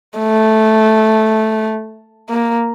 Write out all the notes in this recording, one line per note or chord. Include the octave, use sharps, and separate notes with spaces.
A3
A#3